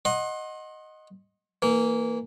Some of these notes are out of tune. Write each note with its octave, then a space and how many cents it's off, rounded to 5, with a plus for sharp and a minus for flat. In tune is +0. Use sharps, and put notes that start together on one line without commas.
D#5 +0 F#5 +0 C6 +35
E3 +0 A#3 -15